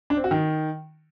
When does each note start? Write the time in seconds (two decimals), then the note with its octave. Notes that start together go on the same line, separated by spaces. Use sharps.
0.10 D4
0.17 C4
0.24 F#4
0.31 D#3